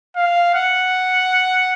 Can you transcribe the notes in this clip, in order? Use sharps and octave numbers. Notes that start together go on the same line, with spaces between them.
F5
F#5